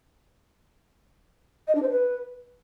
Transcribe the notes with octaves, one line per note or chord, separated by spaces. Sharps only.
D#5
D4
C5
B4